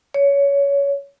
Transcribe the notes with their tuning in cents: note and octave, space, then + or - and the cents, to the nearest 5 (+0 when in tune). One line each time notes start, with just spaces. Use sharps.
C#5 +20